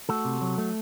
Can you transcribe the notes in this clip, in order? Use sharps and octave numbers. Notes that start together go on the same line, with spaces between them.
A3 F#4 A4
C3
F#3
A3